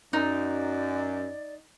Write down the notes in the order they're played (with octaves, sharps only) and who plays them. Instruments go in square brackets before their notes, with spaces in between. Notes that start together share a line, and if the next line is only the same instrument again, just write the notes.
[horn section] F#2 [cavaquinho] D#4 [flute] D5